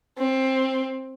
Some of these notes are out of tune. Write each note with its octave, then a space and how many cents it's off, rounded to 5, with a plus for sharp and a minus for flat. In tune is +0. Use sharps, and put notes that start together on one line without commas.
C4 +15